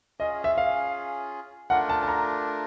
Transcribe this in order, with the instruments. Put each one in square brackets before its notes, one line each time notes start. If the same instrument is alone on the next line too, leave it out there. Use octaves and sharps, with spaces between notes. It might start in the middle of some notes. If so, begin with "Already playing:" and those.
[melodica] C#4 F4 G#4 [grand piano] D#5
[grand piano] E5
F5
[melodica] A3 D4 F4 A#4 [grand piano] F#5
[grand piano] A5
A5
A#5